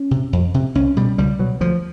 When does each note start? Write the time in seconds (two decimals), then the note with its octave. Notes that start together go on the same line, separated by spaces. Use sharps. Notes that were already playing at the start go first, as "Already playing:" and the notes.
Already playing: C#4
0.11 C3
0.33 F2
0.54 C3
0.75 C2 C#4
0.96 B2 G3
1.18 C#2 G3
1.39 B2 F#3
1.61 D2 F3